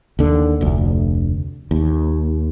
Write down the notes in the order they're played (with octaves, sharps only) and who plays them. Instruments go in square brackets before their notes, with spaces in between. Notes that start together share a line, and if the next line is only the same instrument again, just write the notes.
[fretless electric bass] D#2 D3
F1 D2
D#2